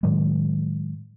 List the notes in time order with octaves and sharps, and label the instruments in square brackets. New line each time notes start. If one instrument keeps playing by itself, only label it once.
[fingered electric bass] A2 D#3 F#3 G#3